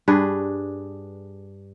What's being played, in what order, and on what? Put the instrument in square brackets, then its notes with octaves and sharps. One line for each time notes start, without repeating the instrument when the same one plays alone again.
[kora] G2 D4 G#4 B4